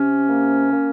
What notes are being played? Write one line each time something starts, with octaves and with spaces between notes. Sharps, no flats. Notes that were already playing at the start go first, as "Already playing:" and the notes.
Already playing: C3 C#4
A#3
A#3